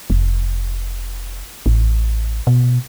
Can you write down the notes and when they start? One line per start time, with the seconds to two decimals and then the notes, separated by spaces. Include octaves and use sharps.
0.10 F1
1.66 A1
2.47 B2